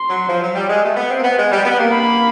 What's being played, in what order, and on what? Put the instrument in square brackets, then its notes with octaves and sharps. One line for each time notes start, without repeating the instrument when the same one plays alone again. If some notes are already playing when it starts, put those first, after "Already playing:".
Already playing: [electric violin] C6
[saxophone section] F#3
F3
F#3
G3
G#3
A3
B3
C4
A#3
B3
G#3
G3
B3
A#3
[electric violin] B5